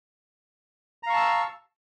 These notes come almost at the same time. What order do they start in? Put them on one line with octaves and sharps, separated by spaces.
A#5 F5 C#6 A5 E6